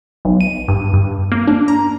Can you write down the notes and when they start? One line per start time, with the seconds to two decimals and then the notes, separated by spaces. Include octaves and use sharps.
0.25 B1
0.41 D#7
0.68 G2
0.93 G2
1.32 A#3
1.47 D4
1.68 A#5